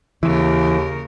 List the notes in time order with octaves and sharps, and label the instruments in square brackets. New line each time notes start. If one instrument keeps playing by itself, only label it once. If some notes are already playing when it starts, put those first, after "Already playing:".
[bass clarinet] D#2 [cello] C#3 A#4 [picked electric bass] E3